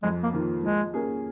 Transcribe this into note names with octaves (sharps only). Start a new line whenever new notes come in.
F2 G#3
A#3
D#3 A#3 F4
F3 G#3
A#3 C#4 G#4